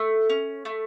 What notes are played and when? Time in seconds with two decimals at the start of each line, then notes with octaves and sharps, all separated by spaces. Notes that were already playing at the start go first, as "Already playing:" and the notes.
Already playing: A3
0.30 C#4
0.65 A3